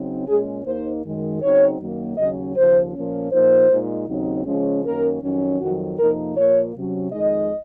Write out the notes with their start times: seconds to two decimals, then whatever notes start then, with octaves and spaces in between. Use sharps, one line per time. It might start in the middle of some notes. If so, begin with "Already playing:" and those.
Already playing: C#3 F#3 C4 D#4
0.27 A#2 G#3 C#4 G#4
0.65 D#2 D#3 A#3 D#4 C5
1.04 F#2 D#3 G#3
1.41 C#3 F#3 C4 D#4 C#5
1.80 F#2 D#3 F#3 A#3
2.17 D#2 C#3 F#3 C#4 D#5
2.56 D#2 C#3 F3 C5
2.93 A#2 F3 A#3 C#4
3.31 A#2 F3 A#3 D#4 C5
3.70 A#2 G#3 D#4
4.07 D#2 C#3 F#3 C4 D#4
4.46 C#3 F3 G#3 C#4
4.84 F#2 D#3 A#3 C#4 A#4
5.22 F2 D#3 F#3 C#4
5.59 F2 D#3 F#3 F#4
5.99 F2 C3 F3 A#3 D#4 A#4
6.35 A#2 F3 A#3 C#5
6.74 C3 F#3 C#4
7.12 F2 D#3 G#3 D#4 D#5